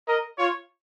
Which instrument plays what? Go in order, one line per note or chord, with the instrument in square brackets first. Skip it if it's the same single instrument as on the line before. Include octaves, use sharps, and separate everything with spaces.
[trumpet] A#4 [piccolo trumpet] D#5
[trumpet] F4 [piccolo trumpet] C#5